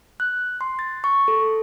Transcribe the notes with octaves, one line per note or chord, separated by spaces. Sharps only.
F#6
C6
A6
C#6
A4